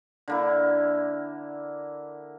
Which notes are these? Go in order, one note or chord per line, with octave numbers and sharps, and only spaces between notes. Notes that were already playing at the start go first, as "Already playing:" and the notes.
D3 A#3 E4